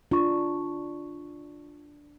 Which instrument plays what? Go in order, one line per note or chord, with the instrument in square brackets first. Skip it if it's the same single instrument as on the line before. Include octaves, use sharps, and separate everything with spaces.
[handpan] D4 [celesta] F4 C#6